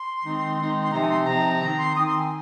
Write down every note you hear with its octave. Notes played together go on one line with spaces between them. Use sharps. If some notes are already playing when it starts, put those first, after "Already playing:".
Already playing: C6
D#3 G#3 C4 D#4
D#3 G#3 C4 D#4
C6
C3 F3 C4 D#4 A#5
G#5
C6
C3 F3 C4 D#4 A#5
D#3 C4 D#4 A#5
C6
D#3 C4 D#4 D#6
C6
G#5